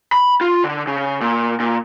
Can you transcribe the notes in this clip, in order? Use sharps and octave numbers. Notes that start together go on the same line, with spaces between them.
B5
F4
D3
C#3
A#2
A#2